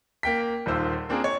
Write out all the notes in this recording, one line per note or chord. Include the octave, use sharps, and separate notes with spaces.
A#3 G5 B6
D#1 D#2 F4 C5 E6
A#3 C4 D4 F4 G#4 A#4
C#5